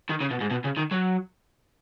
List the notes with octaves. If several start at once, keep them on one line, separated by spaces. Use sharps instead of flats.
D#3
C#3
B2
G#2
B2
C#3
D#3
F#3